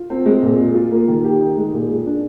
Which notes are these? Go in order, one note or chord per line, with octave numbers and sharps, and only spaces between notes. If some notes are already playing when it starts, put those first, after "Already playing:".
Already playing: F4
C4
G#3
A#2
G#4
F4
A#3
D#3
G4
D#4
G#3
A#2
G#4
D4